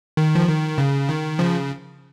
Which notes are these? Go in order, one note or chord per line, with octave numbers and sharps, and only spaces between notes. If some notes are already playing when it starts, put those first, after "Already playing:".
D#3
F3
D#3
C#3
D#3
C#3 F3